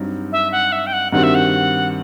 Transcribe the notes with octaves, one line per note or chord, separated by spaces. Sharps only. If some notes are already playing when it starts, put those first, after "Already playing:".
Already playing: G2 F#3 C4 D#4
E5
F#5
E5
G5
F#5
G2 D#3 G3 C4 F#4 F#5
E5
F#5